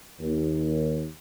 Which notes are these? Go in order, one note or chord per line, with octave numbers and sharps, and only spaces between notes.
D#2